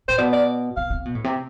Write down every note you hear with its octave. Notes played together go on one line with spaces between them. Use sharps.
A2 C5
B2 D5
D5
C3 F5
C3
B2
A2
C3